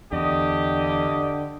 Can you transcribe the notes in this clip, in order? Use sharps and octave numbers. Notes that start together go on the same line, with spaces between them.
E2 D3 G4 D#5